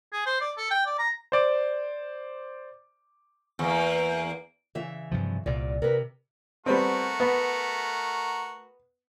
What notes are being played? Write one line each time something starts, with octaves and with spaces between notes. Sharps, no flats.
G#4
C5
D5
A4
G5
D5
A#5
C5 D5 D6
E2 A#3
C#3 E3 E5
G2 C3 F3
C2 A#2 D5
C3 A#4 B4
G3 A3 B3 C4 F#4 A#4
B3